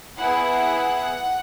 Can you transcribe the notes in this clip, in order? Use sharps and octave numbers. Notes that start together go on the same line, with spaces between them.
B3 E4 G#4 F#5